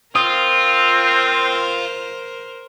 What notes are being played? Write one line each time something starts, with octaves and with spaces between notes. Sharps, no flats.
C4 F4 A#4 C5 D#6